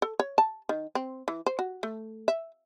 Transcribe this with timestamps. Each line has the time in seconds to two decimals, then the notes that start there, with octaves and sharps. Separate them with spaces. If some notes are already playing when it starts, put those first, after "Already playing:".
0.02 A4
0.19 C#5
0.38 A5
0.69 D#3
0.95 C4
1.28 E3
1.46 C5
1.59 F#4
1.83 A3
2.28 E5